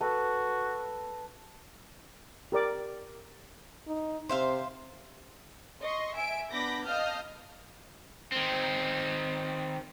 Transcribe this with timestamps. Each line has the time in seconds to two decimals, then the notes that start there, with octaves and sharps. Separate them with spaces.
0.01 F#4 A4 B4
2.52 G4 A#4 D5 D6
3.87 D#4
4.29 C3 C5 E5 F5
5.81 D#5 C6 C#6
6.14 E5 G#5 D7
6.51 B3 D4 B5 D6 G6 A#6
6.85 D#5 F5 A5 D#6 F6 G6
8.32 D#3 C4